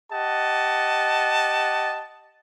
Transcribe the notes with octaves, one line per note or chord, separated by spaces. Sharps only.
G4 D#5 F#5 A5